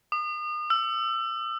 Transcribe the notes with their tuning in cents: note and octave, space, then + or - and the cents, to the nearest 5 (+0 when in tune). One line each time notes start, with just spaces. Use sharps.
D#6 -35
E6 +30